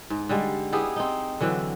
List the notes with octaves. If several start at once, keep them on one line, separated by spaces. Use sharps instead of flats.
G#2
D3 G3 G#3
B3 E4 G4 G#4
C4 D#4
D3 E3 F#3